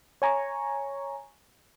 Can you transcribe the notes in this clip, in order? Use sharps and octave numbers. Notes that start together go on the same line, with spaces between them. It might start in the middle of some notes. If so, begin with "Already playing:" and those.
C#5 G#5 A#5 C#6